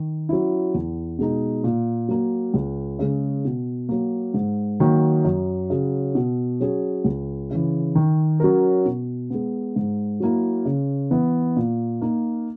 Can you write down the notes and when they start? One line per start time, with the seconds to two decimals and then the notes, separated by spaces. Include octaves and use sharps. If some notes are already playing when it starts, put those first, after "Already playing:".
Already playing: D#3
0.29 F#3 C#4 E4
0.74 E2
1.18 B2 G#3 D#4
1.64 A#2
2.08 F#3 A#3
2.54 C#2
2.99 C#3 G#3 C#4
3.45 B2
3.89 F#3 A#3
4.34 G#2
4.80 D#3 F#3 A#3
5.25 F#2
5.70 C#3 F#3
6.15 B2
6.60 F#3 C#4 G#4
7.04 C#2
7.51 C#3 E3
7.95 D#3
8.40 F#3 C#4 F#4 A#4
8.85 B2
9.30 G#3 B3
9.76 G#2
10.20 F#3 A#3 E4
10.65 C#3
11.10 E3 B3 E4
11.56 A#2
12.02 A#3 D#4